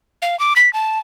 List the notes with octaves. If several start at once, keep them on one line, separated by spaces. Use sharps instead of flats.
F5
D6
B6
A5